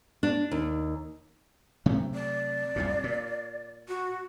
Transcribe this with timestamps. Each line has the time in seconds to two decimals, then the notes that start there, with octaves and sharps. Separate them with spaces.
0.23 D4
0.51 D#2
1.86 C3 F#3 A3
2.15 D5
2.76 C2 F#2 A#2
3.04 A#2
3.88 F#4